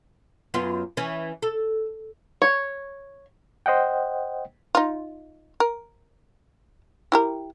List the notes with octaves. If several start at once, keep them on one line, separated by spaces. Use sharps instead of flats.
F#2 B3 F4
E3 C#4
A4
C#5
C5 D#5 F#5 G5
D#4 F4
A#4
E4 G4 A#4